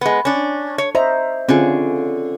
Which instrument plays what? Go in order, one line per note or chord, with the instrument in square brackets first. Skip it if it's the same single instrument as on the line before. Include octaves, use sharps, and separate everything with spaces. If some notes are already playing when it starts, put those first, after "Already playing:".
[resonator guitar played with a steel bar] G#3 B3
C#4 D4
C#5
[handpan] C5 D#5 E5 [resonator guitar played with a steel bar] A#5
[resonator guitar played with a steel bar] D3 G#4 [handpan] C4 C#4 F4